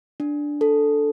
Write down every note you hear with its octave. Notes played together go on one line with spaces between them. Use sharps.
D4
A4